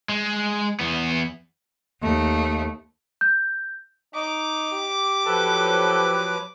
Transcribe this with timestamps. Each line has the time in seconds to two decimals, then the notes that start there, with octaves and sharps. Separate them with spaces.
0.09 G#3
0.80 E2 B3
2.01 D#2 A3
3.21 G6
4.15 D#4 D6
4.73 G4
5.26 F3 F#3 A4 B4